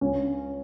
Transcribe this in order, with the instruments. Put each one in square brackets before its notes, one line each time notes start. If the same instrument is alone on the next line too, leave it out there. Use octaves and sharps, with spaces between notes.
[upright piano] C#2 C#4